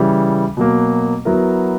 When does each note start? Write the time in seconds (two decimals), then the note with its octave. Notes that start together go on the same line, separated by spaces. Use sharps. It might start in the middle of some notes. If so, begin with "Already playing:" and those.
Already playing: C#3 E3 G3
0.57 B2 F#3 A#3
1.25 F#3 B3 E4 A#4